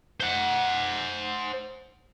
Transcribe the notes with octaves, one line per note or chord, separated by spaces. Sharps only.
C5 F#5